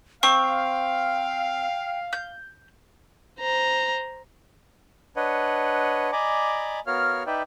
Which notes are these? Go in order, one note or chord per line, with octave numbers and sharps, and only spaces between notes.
C4 F5 G5 C#6
G6
C5 A#5
D4 B4 C#5 D#5 F#5
D5 D#5 G#5 A#5 B5 D6
B3 F#4 A#4 C#5 F5 F6
D#4 B4 D5 E5 G5